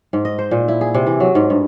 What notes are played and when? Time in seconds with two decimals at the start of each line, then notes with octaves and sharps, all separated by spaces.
0.13 G#2
0.25 D#5
0.38 C5
0.51 A#2
0.68 E4
0.81 G#4
0.94 C3
1.06 E3
1.20 F#3
1.35 G#2
1.50 G2